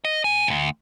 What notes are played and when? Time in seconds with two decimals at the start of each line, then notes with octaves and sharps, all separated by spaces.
0.05 D#5
0.24 B2 G#5
0.46 D2 G2